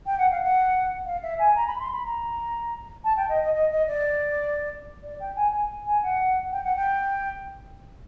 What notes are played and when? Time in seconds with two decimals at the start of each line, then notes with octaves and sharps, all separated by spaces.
0.06 G5
0.18 F#5
0.30 F5
0.42 F#5
1.05 F5
1.22 E5
1.39 G#5
1.55 A#5
1.67 B5
1.80 C6
1.92 B5
2.04 A#5
3.04 A5
3.16 G5
3.29 D#5
3.42 D#5
3.54 D#5
3.71 D#5
3.87 D5
5.03 D5
5.20 G5
5.36 G#5
5.52 G#5
5.86 G#5
6.02 F#5
6.51 G5
6.64 F#5
6.75 G5